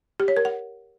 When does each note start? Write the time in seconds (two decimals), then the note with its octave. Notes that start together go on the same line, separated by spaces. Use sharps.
0.20 G4
0.28 C#5
0.37 A#4
0.45 F#5